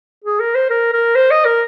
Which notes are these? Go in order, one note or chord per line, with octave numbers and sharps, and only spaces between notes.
G#4
A#4
C5
A#4
A#4
C5
D#5
A#4